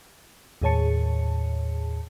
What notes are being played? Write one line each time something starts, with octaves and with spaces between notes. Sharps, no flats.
D#2 A2 G#4 C#5 A5 C#7